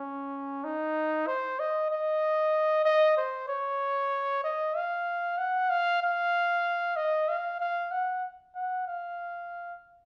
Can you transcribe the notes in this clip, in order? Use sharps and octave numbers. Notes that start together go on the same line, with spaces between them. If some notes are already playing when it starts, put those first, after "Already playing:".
Already playing: C#4
D#4
C5
D#5
D#5
D#5
C5
C#5
D#5
F5
F#5
F5
F5
D#5
F5
F5
F#5
F#5
F5